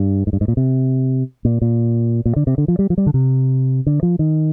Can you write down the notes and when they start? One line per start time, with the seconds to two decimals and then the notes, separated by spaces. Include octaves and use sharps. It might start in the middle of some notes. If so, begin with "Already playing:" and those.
Already playing: G2
0.27 G#2
0.33 G2
0.41 G#2
0.48 A#2
0.57 C3
1.45 A#2
1.62 A#2
2.25 A#2
2.36 D3
2.47 C3
2.58 D3
2.68 F3
2.79 G3
2.90 F3
2.98 G3
3.06 D3
3.14 C3
3.87 D3
4.03 F3
4.19 D#3